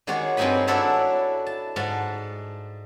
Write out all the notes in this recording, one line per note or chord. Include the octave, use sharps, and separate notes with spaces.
D#3 G#3 F#4 G#4 C#5 D5
G2 G#3 C4 D#4 G#5 B5
D4 E4 F#4 A4 C#5 E5
A5
G#2 F#5 A5